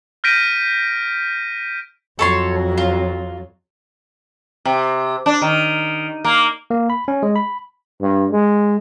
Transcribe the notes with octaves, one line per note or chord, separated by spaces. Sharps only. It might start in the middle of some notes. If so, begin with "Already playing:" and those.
F6 G6 A#6 B6 D7 D#7
F2 F#3 A4 C#5 C6
F4
C3
D4
D#3
A#3
A#3
B5
C#4
G#3
B5
G2
G#3